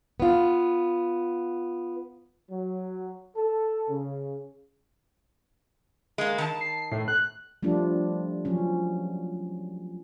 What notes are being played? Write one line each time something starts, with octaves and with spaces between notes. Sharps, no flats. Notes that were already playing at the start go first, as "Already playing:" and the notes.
B3 F4
F#3
A4
C#3
G#3 A#3
D#3 A5
C7
A2
F#6
F3 G3 A3 D4 F4
F3 F#3 C#4